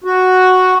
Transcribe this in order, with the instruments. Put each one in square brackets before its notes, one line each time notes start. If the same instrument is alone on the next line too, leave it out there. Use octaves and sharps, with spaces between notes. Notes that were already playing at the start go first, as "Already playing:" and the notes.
[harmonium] F#4